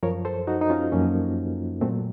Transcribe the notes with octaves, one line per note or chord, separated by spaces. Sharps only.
F#2 F3 A#4 C#5
A4 C5
D#4 F#4
D#4
C#4 F4
F#2 F3 A#3 C#4
A#2 F#3 A3 C4